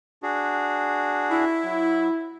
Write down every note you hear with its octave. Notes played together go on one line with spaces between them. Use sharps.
D4 F#4 G#4
E4
F#3